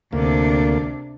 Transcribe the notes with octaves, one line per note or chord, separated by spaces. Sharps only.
D2 C3 A#3 D4